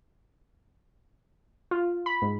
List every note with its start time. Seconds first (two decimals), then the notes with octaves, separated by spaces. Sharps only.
1.71 F4
2.06 B5
2.22 G#2